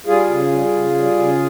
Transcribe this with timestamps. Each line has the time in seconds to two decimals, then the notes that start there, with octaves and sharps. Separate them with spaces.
0.07 G3 F4 G#4
0.29 C#3
0.52 G3
0.74 C#3
0.96 G3
1.18 C#3